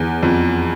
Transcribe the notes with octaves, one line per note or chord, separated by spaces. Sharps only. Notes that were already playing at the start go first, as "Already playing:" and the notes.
Already playing: E2
F2